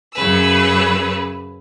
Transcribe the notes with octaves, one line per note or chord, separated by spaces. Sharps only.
F#2 C#3 B4 E6